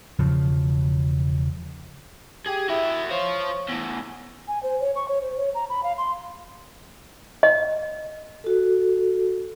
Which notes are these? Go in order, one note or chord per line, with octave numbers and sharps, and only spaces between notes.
E1 C#3 F3
G4 G#4
E4 F#4 E5
C5 C#5 F5
E2 A2
G#5
C5
C#5
C#6
C#5
C5
C#5
A#5
B5
F5
C6
D#5
F#4 A4